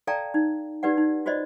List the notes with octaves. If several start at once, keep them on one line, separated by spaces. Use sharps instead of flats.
A4 D5 F5 G5 A5 A#5
D#4
D#4 G4 B4 D5 F#5
D#4
F4 F#4 C5 D5 D#5